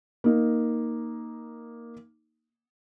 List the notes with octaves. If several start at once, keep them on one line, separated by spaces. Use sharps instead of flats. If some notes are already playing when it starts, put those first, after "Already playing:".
A#3 D#4